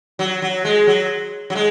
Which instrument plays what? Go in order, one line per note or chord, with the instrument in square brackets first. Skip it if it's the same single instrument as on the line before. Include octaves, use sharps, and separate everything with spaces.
[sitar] F#3
F#3
G#3
F#3
F#3
G#3